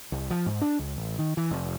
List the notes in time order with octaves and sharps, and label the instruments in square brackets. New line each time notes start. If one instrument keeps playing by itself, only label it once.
[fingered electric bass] C2
F3
G#2
D4
C#2
A1
D#3
E3
F1